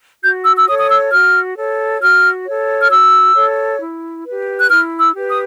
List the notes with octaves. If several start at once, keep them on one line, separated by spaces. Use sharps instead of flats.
F#4 G6
E6
E6
A4 C#5 D#6
D#6
E6
F#4 F6
A4 C#5
F#4 F6
A4 C#5
F6
F#4 E6
A4 C#5
E4
G4 B4
F#6
E4 F6
E6
G4 B4
D#6